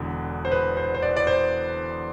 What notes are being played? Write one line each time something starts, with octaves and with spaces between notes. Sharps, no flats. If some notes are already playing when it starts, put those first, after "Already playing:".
Already playing: E1 E2 D3
C5
B4
C5
C5
D5
D5
C5